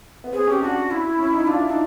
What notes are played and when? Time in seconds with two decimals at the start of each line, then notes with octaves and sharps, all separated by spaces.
0.24 B3
0.33 C4 G#4
0.48 C#4
0.50 G4
0.62 D4 F#4
0.91 E4
1.19 C#4
1.33 D#4
1.47 D4 F4
1.59 E4
1.67 D4 D#4